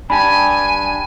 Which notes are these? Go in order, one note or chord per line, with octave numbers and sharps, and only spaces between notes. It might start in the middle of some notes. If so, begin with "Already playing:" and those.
D4 G4 G#5 A5 B5